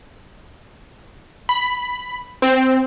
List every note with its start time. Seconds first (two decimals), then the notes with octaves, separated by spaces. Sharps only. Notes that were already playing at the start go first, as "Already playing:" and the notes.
1.49 B5
2.42 C4